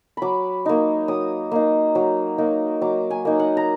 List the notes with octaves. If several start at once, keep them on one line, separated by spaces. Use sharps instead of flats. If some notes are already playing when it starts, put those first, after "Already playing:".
F#3 B5 D6
A#3 D#4
F#3 D#6
A#3 D#4
F#3
A#3 D#4
F#3 D6
G#5
A#3 D#4
F#5
A#5